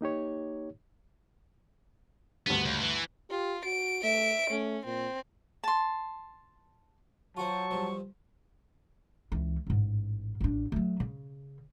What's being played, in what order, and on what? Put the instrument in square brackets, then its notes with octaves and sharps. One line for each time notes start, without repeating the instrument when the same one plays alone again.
[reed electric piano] A#3 D#4 G4 C#5
[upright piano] D2 G2 [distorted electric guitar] B3
[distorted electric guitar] C#2
E3
[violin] F4 [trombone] G4
[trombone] F#4 [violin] D7
[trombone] A3 [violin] E5 D7
[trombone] A3 [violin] C#4
[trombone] A#2 [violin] C4
[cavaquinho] A5 C6
[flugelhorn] F#3 [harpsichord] F4 F#4 C5 [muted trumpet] A5 [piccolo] C#6
[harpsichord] G2 F3
[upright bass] C#2 E3
A1 G#2
A1 D4
F#3 A3
C#3